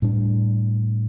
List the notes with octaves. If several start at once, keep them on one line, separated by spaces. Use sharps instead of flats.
A2 G3 D4